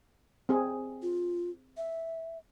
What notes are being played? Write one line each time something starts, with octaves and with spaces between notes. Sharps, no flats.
C4 G#4
F4
E5